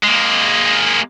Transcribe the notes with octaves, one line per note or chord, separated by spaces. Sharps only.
G#3 A#3